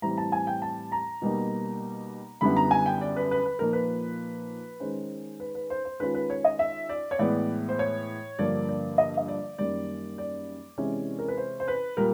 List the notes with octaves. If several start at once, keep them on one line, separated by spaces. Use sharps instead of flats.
A2 E3 G3 C4 E4 A#5
A5
G#5
G5
A5
A#5
B2 G3 A#3 D#4
F#2 D3 G3 B3 E4 B5
A#5
G#5
G5
D5
B4
B4
B4
A#2 F3 A#3 D#4 A#4
B4
D#3 G#3 C#4 C5
B4
B4
C5
C5
D#3 G#3 C#4 F4 B4
B4
C#5
D#5
E5
D5
C#5
A2 E3 G#3 B3 D5
C5
C#5
G2 D3 F3 A#3 D5
D5
D#5
D#5
D5
F#2 D#3 G3 A#3 D5
D5
C3 E3 G#3 C#4 E4
A#4
B4
C5
C5
B4
A#2 G3 A#4